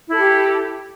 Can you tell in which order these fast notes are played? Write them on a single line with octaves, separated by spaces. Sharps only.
E4 A4 G4